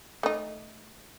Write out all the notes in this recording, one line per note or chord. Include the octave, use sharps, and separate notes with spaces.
A3 D#4